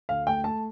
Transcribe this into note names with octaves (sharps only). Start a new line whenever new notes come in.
D2 F5
A3 G5
A3 A5